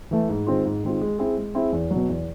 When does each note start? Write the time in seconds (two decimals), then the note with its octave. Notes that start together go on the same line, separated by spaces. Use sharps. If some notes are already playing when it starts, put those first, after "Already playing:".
0.11 E3 A3
0.29 G#2
0.47 D#3 G#3 C4 F4
0.65 G#2
0.84 D#3 G#3 C4 F4
1.01 G#3
1.19 C4 E4 G#4
1.37 G#3
1.55 C4 E4 G#4
1.73 E2
1.91 F#3
1.96 B2
2.09 E2